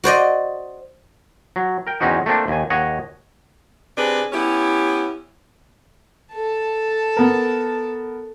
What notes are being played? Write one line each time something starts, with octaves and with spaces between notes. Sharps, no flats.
F#4 C5 D5 D#5
F#3
A#4 G5
E2 C4 C#4 D#4 F#4 D#5
A3 A#3 C4 D4
D#2 G#5
D#2 C#5 D#5 F#5
C3 D4 G#4 B4
B3 C#4 E4 G4
A4 A5
B3 A#4